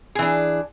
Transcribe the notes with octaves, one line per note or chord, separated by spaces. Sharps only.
E3 D4 G#4